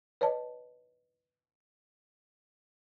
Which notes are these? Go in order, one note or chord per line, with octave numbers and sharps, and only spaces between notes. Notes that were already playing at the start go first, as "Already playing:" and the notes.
B4 C#5 D#5 A5